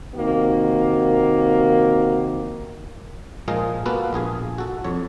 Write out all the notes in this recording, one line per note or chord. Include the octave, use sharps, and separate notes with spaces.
C3 D#3 A#3 F#4
A#2 F3 G#3 F4 G#4 A#4
A#3 B3 F4 F#4 A4 B4
A#1 F4 G#4 G#5
F#4 A4
F2 C#5